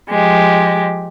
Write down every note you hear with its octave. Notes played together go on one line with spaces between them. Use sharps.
F3 G#3 G4